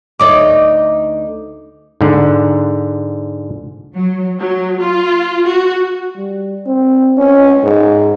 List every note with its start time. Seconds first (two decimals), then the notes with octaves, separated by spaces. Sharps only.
0.19 D2 D#4 C#5 D6
2.01 G#2 D3
3.94 F#3
4.39 F#3
4.80 F4
5.45 F#4
6.16 G3
6.66 C4
7.17 C#4
7.64 G#2